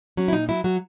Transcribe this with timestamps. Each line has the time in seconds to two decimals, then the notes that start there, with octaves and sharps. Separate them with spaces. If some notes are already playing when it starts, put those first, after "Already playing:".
0.17 F#3 C#4
0.28 E4
0.33 A#2 D#4
0.49 F#3 E4
0.64 F#3 F#4